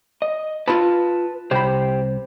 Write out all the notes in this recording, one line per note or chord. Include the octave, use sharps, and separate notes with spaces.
D#5
F4 B4 A5 B5
C2 G4 C5 G5 B5